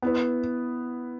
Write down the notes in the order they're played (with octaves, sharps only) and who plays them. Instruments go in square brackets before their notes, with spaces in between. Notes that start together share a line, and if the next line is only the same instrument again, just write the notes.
[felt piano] B3 E4 B4